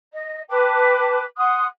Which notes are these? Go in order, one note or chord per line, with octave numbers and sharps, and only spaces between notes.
D#5
B4 G5 A5 D6
F#5 C6 D#6 F#6